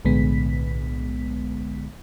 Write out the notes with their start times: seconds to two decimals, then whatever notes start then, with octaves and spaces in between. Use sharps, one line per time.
0.05 B1 A2 D3 G#3 B3 B6